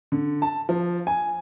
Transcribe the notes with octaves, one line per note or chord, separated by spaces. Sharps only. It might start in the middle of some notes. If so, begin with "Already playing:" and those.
D3
A5
F3
G#5